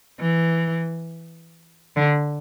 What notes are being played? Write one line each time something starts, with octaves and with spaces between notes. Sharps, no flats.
E3
D3